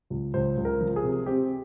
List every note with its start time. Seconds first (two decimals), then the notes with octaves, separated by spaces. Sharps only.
0.10 C#2
0.34 C#2 C5
0.57 C#2
0.65 A#4
0.81 F3
0.96 G#4
1.04 C3
1.26 C4 G4